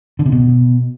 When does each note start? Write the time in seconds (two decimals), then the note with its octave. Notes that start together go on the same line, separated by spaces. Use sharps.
0.19 D3
0.26 C3
0.32 B2